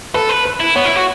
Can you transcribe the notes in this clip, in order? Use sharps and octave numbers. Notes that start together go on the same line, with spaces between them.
A4 B4
B4
B4
E4
B3 C#5
E4
F#4